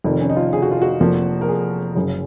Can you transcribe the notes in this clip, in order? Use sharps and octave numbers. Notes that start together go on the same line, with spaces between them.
F1 F2 D#3
C#4
D#4
F4
G#4
F#4
F4
F#4
F1 F2 F3 A#3
A#4
G#4
F#1 F#2 C#3